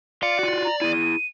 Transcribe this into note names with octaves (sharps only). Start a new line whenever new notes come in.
D5 F5 C6 C#7
F4 F#4
A#5
E4 G#4 D#7